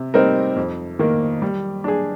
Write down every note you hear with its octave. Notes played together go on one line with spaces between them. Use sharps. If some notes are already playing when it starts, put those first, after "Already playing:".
Already playing: C3
G3 C4 D#4 A#4
F2
D#3 A#3
G3
D4 G#4